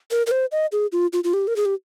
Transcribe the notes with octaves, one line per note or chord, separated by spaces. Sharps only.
A#4
A#4
C5
D#5
G#4
F4
F4
F4
G4
A#4
G#4
G4